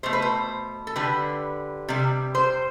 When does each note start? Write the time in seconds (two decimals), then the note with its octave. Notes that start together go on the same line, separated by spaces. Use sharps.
0.03 B2 A3 C5
0.13 B4
0.22 C5
0.87 A4
0.96 D3 G3 B4
1.88 C3 G3
2.35 C5